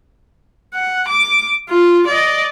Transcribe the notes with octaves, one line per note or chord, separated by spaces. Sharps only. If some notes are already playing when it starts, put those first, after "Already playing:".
F#5
D6
F4
D5 D#5